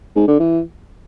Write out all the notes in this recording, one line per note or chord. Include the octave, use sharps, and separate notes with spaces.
G#2
D3
E3